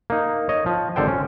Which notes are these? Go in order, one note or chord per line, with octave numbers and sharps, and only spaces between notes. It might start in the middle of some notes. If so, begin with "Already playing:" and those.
A#3 D#4
C#5 D#5
F3
G#1 D3 A4 C5 G5
C#4